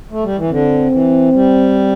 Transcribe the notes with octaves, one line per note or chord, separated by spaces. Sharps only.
A3
G3
E3
D3 C4
E3
G3